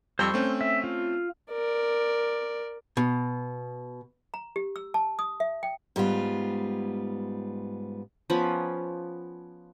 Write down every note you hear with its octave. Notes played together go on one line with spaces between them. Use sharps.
F2 G3 C5 C6 C#6 E6
A3 C4 C#4
E5
F4
A#4 D5
B2
A#5
G4
E6
A5
D#6
E5
G5
G#2 G3 B3 F4
F3 B3 C#4 B5